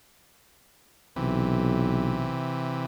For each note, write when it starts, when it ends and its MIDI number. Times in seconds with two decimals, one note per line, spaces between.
1.16 2.37 35
1.16 2.86 48
1.16 2.86 52